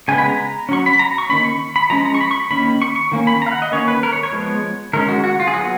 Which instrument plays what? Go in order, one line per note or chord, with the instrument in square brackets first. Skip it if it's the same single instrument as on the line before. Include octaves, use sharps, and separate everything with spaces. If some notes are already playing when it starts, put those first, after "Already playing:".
[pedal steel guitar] C#3 G#3 B3 G#5
B5
A#5
F#3 C#4 C#6
B5
A#5
C#6
D#3 A#3 C#4 B5
C#6
B5
F3 G#3 C#4 A#5
A#5
C#6
B5
C#6
D#3 A#3 C#4 B5
C#6
C#6
D#3 A#3 C#4
B5
A#5
F5
F#5
D#5
D#3 A#3 C#4 C#5
B4
A#4
C#5
C#5
F3 G#3 B3
D#3 G#3 C#4 A#4
F#4
F#4
F4
G#4
F#3 B3 F#4